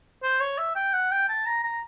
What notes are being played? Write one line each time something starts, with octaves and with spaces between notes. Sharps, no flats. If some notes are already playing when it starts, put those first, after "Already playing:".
C5
C#5
E5
G5
F#5
G5
A5
A#5
A#5